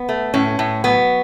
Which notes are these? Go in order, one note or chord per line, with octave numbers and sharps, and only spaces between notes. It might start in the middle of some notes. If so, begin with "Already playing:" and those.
Already playing: B3
A3
A2 C#4
A2
F#3 B3